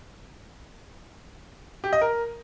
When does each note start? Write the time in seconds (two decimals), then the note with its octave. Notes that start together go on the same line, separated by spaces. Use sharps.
1.84 G4
1.93 D#5
2.01 A#4